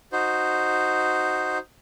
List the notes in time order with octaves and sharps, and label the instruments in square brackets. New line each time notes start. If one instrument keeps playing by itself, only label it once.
[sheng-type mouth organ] D#4 F#4 C5